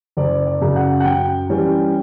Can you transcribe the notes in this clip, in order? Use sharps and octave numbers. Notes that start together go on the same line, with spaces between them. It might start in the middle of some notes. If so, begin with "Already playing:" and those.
F#1 D5
D5
F#2 C#3
F#5
F#5
F#2 G5
E3 G3 C#4